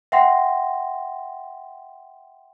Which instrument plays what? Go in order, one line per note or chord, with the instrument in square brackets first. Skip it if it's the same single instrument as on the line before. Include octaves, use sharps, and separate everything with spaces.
[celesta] E5 F#5 G5 C6 A#6